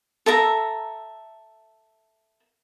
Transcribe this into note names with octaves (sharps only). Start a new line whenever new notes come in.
A4 E5 A#5